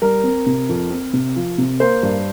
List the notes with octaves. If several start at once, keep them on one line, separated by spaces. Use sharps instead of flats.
G3 A#4
C4
C3
F2
C4
C3
F3
C3
A#3 C5
G2